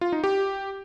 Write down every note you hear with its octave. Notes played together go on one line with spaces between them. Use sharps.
F4
D#4
G4